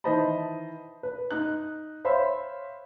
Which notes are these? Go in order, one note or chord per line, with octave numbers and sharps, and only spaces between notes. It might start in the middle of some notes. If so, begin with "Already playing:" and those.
D#3 E3 C5 D#5 A5 B5
B4
D#4 F#6
C5 C#5 E5 F5 B5 C6